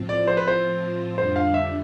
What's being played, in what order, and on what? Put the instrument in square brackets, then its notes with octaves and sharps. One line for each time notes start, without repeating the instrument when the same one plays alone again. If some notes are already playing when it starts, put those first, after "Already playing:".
Already playing: [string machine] A2 F3 C4 F4
[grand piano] D5
C5
B4
C5
[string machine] F2 D3 G3 D4 [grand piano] C5
[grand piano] F5
E5